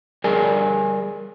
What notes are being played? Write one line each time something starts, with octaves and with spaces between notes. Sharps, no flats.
G3 G#4 A#4 D5 G#5